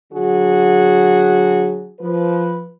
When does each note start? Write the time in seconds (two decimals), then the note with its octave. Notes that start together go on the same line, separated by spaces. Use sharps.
0.13 D3 F#3 F#4 G#4
2.00 F3 B4